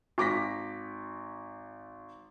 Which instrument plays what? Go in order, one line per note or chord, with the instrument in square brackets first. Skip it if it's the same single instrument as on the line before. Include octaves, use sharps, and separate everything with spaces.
[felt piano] G#1 D6 A#6 B6